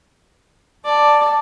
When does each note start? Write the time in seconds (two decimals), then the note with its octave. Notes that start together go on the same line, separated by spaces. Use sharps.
0.85 D5 A5